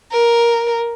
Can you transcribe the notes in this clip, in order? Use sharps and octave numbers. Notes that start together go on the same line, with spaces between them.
A#4